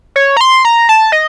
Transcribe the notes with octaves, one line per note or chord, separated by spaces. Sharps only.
C#5
A#5
C6
A#5
A5
D#5